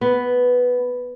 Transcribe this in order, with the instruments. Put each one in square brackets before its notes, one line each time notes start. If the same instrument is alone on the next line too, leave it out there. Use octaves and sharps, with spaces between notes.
[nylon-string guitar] B3